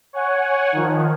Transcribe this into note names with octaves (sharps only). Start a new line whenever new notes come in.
C#5 F#5 G#5
D#3 F3